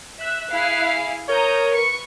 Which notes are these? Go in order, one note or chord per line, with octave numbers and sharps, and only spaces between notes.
E5 F#6
E4 G#4 F5
A#4 C#5 A#5 D#6 G6
B4 C#6 C#7